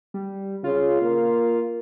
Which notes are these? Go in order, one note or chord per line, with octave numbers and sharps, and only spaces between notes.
G3
C#3 F4
A#3